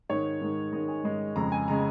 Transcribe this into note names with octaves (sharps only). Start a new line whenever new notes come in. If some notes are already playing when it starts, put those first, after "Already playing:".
G#2 D#3 G#3 C#5
G#2 D#3 G#3
G#2 D#3 G#3 D#5
G#5
G#2 D#3 G#3
F2 C#3 G#3 A#5
G#5
C#3 G#3 A#5